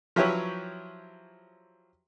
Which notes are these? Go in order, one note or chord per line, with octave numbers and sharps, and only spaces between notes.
F3 F#3 E4 G4 B4 C#5